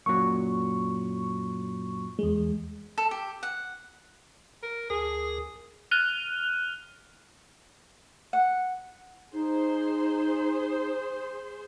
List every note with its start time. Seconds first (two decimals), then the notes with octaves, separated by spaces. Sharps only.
0.06 F#2 A#2 F#3 C#6
2.19 E2 G#3
2.98 A4
3.11 G4
3.43 F#5
4.63 A#4
4.90 D2 G#4 A#4
5.91 F6 F#6 D#7 F7 G7
8.33 F#5
9.33 D#4 G#4 C5 C6